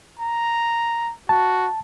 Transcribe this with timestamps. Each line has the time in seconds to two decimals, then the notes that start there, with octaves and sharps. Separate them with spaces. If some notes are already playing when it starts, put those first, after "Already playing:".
0.19 A#5
1.29 F#4 A5